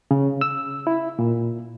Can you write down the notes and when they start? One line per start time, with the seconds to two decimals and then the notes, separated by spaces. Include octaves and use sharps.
0.11 C#3
0.41 E6
0.87 E4
1.19 A#2